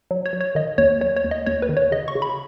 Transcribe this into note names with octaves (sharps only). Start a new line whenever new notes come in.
F#3
C#5
F#3
C#5
D#3 D#5
D#2 C#5
F#3 C#5
C#5
D#2
D#5
D#2 C#5
B4
D#3
C#5
C#3 D#5
C#6
C#3
B5